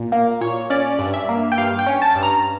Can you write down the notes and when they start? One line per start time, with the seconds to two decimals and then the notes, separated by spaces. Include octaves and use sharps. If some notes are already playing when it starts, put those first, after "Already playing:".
Already playing: A#2
0.12 A#3
0.41 A#2 C#5
0.70 C#4 D5
0.99 G2
1.14 E5
1.29 A#3
1.52 G5
1.58 G2 F5
1.79 G5
1.86 C#4
2.02 A5
2.15 G2
2.23 A#5